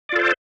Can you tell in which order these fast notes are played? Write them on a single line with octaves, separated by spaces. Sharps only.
D5 F4 A4 C5